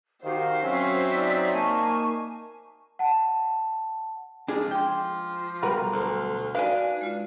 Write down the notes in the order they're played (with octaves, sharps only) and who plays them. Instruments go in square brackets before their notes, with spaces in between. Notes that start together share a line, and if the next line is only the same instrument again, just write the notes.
[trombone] D#3 [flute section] F#4 G4 F5 [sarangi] C5
[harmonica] F#3 C4 [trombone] C#4 [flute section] E5 C6 E6
[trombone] D#4 [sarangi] D5
[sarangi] A#3 [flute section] G#5 A5 C#6
[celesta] F#5 A5
[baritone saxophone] F3 [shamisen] G#3 [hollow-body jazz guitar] D4 G#4
[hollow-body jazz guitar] G5 [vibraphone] C6 D6
[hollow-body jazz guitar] B1 G3 [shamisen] F#4 A#4 B4
[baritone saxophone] D2
[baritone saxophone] D4 [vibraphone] D#4 F#4 D5 [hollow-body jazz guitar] B4 G#5 [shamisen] F5
[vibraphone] G#3 F4